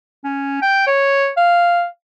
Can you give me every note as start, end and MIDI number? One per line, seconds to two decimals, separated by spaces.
0.25 0.57 61
0.62 0.86 79
0.87 1.30 73
1.37 1.86 77